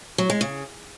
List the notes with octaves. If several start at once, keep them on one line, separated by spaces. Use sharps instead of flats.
F#3
G#3
C#3